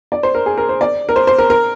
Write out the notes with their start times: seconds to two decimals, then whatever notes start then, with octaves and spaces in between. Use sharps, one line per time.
0.12 D5
0.23 C5
0.35 A#4
0.46 G#4
0.58 A#4
0.69 C5
0.81 D5
1.09 A#4
1.16 C5
1.27 C5
1.38 A#4
1.50 A#4